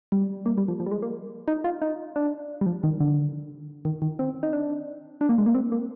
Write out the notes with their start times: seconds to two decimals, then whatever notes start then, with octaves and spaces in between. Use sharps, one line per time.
0.12 G3
0.46 A#3
0.58 G3
0.68 F3
0.80 F3
0.86 G3
0.91 G#3
1.02 A#3
1.48 D#4
1.64 F4
1.82 D#4
2.16 D4
2.61 G3
2.66 F3
2.83 D#3
3.00 D3
3.85 D#3
4.02 D#3
4.19 C4
4.43 D#4
4.53 D4
5.21 D4
5.29 A#3
5.38 G#3
5.46 A#3
5.55 C4
5.72 A#3